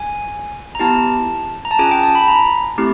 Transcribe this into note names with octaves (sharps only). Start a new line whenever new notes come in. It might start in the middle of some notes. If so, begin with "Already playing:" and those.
Already playing: G#5
A#5
B3 E4 G4 A5
A#5
A5
C#4 F4 G#4 G#5
G5
A5
B5
A#5
A3 C4 E4 G4